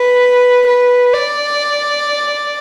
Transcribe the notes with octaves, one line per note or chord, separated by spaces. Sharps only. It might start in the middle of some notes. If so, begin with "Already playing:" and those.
Already playing: B4
B4
D5